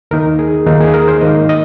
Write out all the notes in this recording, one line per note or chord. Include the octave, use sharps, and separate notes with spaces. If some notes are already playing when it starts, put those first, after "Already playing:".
D#2 D#3 A#3 D#4 A#4
G#4
D#2 D#3 A#3 D#4 F4
G#4
A#4
C5
G#2 D#3 A#3 D#5
D#5